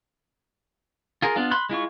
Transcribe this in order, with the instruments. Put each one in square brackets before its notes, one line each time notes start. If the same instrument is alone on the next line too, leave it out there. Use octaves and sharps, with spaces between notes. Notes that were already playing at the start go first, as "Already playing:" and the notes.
[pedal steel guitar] F4 G#4 A#4
B3 D4 F4
B5 C6 F#6
G#3 E4 F4 C#6